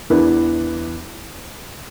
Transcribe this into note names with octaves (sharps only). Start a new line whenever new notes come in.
E2 E3 D4 B4